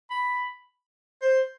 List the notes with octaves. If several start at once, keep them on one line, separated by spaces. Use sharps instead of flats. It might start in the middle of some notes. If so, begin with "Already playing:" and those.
B5
C5